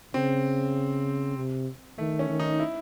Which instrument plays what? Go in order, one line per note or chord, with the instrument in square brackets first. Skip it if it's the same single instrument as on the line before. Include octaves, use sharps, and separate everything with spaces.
[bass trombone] C#3 [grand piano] C4
[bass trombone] C3
[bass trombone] D#3 [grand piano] A3
[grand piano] C#4
[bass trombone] D#3
[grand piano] D#4
E4